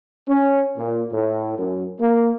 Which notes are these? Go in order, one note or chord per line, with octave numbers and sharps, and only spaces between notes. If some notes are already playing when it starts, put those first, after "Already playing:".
C#4
A#2
A2
F#2
A#3